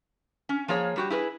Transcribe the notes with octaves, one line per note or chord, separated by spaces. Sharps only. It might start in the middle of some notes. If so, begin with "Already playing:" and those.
C#4
F3 A#3 G#4 C#5
G3 F#4 G4
E4 G#4 A#4 B4